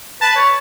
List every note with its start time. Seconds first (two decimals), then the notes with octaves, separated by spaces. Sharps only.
0.22 B4 A5
0.35 C#5